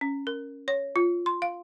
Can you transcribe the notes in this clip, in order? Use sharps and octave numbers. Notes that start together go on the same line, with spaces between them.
C#4
A#4
C#5
F4
C6
F5